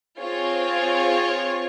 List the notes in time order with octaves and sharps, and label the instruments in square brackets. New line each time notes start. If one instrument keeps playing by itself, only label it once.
[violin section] C4 F4 G#4 C#5